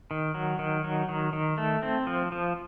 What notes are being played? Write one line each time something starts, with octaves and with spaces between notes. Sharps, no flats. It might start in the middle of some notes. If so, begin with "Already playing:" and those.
D#3
F#3
D#3
F#3
D#3
D#3
A3
C4
F3
F3